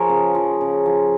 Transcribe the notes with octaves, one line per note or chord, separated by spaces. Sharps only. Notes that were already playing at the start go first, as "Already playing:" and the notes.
Already playing: F3 G#4 A#4 C#5
C#3
F3
C#3
F3